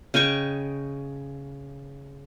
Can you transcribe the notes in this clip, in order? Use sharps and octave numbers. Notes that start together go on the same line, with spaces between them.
C#3 D#5 G5 C#6